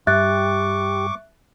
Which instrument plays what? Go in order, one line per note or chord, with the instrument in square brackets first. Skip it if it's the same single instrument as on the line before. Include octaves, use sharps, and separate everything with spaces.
[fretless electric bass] G2 [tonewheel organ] G4 [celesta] E5 F#6 A6 [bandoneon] C#6 D6